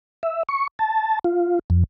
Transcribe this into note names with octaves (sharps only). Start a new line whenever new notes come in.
E5
C#6
A5
F4
F2